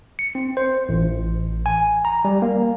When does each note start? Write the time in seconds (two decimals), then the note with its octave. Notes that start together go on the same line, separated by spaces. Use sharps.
0.19 C#7
0.35 C4
0.57 C5
0.89 A1
1.66 G#5
2.05 A#5
2.25 G3
2.42 A#3